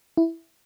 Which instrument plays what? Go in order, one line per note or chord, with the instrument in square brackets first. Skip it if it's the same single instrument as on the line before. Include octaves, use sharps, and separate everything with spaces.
[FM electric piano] E4